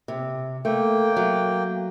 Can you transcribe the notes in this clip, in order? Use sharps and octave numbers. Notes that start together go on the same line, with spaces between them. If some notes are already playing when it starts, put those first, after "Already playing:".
C3
A3 A#3 G5
F#3